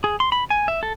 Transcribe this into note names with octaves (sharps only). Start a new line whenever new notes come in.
G#4
C6
B5
G#5
E5
A4